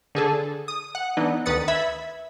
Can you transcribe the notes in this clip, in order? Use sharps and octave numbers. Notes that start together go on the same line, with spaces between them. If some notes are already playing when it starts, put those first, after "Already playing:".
D3 G#4 A4
D#6
F#5
E3 B3 D4 D#4
D2 D#3 B4 D#6 A6 C#7
E5 B5 G#6